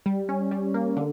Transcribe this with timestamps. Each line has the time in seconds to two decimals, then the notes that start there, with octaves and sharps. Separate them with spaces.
0.06 G3
0.29 C#4
0.51 G3
0.74 A#3
0.96 D3